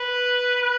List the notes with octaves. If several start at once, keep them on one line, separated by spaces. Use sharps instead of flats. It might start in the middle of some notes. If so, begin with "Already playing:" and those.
Already playing: B4
B4